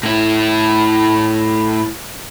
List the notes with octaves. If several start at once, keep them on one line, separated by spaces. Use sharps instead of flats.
A2 E4